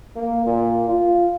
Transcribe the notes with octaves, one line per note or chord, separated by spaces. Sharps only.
A#3
A#2
F4